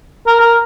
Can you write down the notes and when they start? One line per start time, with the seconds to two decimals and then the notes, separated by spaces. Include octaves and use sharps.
0.27 A#4
0.41 A#4